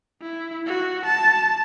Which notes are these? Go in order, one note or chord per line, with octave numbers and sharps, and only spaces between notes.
E4
F#4
A5